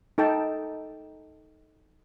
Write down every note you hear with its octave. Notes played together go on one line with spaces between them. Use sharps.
D#4 A4 G5 A5